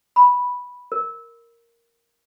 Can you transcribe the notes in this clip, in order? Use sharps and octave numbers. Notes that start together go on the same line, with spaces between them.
B5
A#4